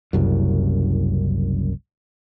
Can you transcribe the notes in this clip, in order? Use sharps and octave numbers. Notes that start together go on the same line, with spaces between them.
F#1 C2 F#2